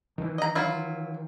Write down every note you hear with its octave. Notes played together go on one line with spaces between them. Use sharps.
D#3 E3
D#5 A#5
F#3 E4 F4